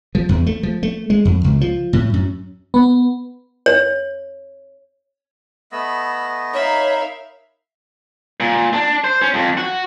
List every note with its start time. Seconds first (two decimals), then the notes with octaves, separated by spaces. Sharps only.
0.15 F3
0.29 E2
0.46 A3
0.63 F3
0.83 A3
1.10 G#3
1.25 F2
1.44 C#2
1.61 F3
1.93 A2
2.14 F#2
2.74 B3
3.66 C#5
5.72 A3 B3 D#5 B5 E6
6.54 D#4 A#4 C#5 E5 F5 B5
8.40 A#2
8.74 D4
9.04 C5
9.22 C#4
9.34 F2
9.58 F#4